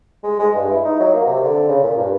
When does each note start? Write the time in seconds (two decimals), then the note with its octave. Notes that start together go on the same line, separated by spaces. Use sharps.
0.23 G#3
0.39 G#3
0.54 G2
0.71 E4
0.85 D#4
1.00 F#3
1.14 A#3
1.26 C3
1.43 D3
1.68 C#3
1.83 A#2
1.98 G2